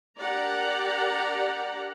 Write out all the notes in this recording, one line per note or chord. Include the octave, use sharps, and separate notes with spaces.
D4 G4 A#4 D5 F#5 A#5